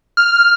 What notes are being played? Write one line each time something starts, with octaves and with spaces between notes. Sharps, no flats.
F6